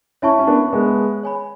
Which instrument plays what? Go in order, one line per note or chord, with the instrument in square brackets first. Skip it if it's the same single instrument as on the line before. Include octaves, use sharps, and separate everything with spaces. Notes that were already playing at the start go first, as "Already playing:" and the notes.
[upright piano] C#4 E4 [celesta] C#5 E5 A5 C#6
[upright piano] C#4
B3 D4
G#3 B3
[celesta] C#5 G#5 B5